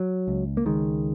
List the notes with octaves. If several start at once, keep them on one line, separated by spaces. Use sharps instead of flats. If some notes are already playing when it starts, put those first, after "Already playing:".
Already playing: F#3
C#2
A#3
C#2 D#3 G#3